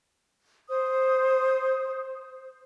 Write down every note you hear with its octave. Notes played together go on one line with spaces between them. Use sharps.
C5 D#6